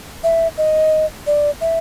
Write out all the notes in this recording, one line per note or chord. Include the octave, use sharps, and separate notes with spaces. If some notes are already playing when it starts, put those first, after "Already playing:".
E5
D#5
D5
E5